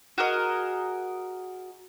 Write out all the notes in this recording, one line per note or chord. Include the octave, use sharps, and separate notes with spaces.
F#4 G#4 A#4 D#5